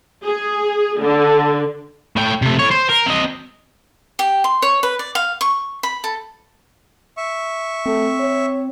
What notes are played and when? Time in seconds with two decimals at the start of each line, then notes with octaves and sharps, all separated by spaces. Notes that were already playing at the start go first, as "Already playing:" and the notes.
0.24 G#4
1.01 D3
2.16 A2 G5
2.42 C3 A3
2.59 A2 C#5
2.71 C5
2.89 A#4
3.07 C4 D#5
4.19 G4
4.44 C6
4.62 C#5
4.83 B4
4.99 D5
5.15 F5
5.41 C#6
5.83 B5
6.04 A4
7.17 E5 C#6
7.86 A3 C4
8.20 C#5